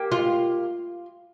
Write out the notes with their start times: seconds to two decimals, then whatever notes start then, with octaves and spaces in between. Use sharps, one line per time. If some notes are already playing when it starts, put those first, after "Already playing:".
Already playing: A#3 G4
0.12 F4